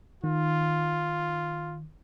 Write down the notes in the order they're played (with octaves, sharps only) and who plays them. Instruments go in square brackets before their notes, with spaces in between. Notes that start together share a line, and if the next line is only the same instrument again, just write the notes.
[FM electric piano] D#3 [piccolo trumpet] F4